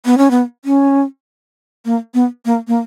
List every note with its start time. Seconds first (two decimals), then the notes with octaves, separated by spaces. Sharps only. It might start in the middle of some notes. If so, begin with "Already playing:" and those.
0.05 B3
0.18 C#4
0.30 B3
0.65 C#4
1.85 A#3
2.14 B3
2.45 A#3
2.67 A#3